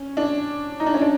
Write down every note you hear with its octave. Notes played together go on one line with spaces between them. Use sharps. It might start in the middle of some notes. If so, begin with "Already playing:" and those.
Already playing: C#4
D4
D#4
D4
C#4
D4